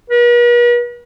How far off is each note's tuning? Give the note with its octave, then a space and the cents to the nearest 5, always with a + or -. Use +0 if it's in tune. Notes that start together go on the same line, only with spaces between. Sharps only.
B4 -45